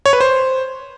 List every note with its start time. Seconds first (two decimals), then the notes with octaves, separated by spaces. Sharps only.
0.06 C#5
0.13 B4
0.20 C5